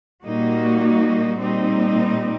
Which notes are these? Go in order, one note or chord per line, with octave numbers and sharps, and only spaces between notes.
A#2 G3 A#3 D#4 F#4
A#2 G3 C4 D#4